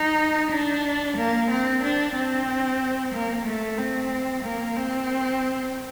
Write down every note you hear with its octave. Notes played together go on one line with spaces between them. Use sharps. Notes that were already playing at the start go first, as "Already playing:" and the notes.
Already playing: D#4
D4
A#3
C4
D4
C4
A#3
A3
C4
A#3
C4